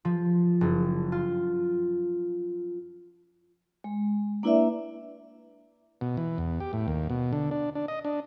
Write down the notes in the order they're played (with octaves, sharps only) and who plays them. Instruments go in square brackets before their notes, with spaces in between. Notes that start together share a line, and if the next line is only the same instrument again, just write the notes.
[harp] F3
F#1
F4
[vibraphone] G#3
A#3 D4 E4 B4 D5 E5
[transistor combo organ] B2
E3
E2
G4
A2
D#2
B2
D3
D4
D4
D#5
D4